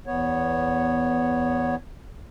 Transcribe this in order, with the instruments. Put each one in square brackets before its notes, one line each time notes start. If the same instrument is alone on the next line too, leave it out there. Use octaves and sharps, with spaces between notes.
[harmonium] E2 B3 C#5